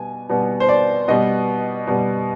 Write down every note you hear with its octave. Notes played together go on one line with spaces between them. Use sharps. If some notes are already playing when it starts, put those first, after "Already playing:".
Already playing: B2 G3 B3 G#5
B2 G3 B3
C5
D5
B2 G3 B3 D#5
B2 G3 B3